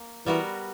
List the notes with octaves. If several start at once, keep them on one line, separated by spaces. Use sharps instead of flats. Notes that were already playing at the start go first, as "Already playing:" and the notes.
Already playing: A#3
E3 G3 B3 F#4 A#4